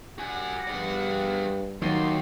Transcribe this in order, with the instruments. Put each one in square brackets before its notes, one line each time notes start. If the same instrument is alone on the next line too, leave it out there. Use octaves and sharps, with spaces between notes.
[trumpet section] G3 F#5 [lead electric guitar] F#4 G#5
[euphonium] G2 [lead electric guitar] G#4 D5
[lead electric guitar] D#2 [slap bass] D#3 [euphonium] F#3 [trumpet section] C6